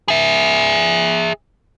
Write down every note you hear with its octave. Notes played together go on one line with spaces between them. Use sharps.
G#4 E5